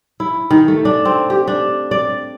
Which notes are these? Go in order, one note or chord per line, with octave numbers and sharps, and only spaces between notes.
E4
D#3
A3
D4
C4
G4
D4
D5